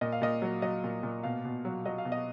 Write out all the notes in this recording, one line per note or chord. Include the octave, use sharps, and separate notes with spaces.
A#2 D#5
F5
A#2 D#5
F#3
F#3 D#5
A#2
A#2
B2 F5
B2
F#3
F#3 D#5
F5
B2
D#5